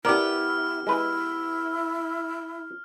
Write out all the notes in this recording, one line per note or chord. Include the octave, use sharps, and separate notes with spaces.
B3 E4 G4 A#4 D5 F6
G#3 E4 B4